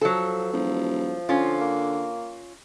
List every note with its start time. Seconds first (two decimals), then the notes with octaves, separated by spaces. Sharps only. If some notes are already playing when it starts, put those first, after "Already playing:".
0.01 F3 F#3 A4
0.53 E1 F3
1.29 D3 C#4 F4
1.61 A#3